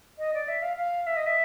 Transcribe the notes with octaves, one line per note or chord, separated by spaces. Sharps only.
D#5
D5
E5
F5
F5
E5
D#5
E5